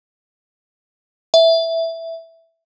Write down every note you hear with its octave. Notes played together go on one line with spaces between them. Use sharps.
E5